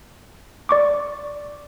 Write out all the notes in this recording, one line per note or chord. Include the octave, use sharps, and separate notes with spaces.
D5 C#6 D6